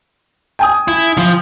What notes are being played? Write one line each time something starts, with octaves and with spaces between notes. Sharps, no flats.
G5 G#5 D#6
E4
F3